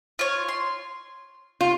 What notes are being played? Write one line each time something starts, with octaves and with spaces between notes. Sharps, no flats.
F4 C#5
C6
F4